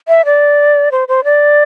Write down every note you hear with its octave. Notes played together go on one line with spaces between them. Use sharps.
E5
D5
C5
C5
D5